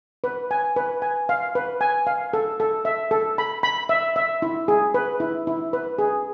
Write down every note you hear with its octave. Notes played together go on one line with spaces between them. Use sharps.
B4
G#5
B4
G#5
F5
B4
G#5
F5
A4
A4
E5
A4
B5
B5
E5
E5
E4
G#4
B4
E4
E4
B4
G#4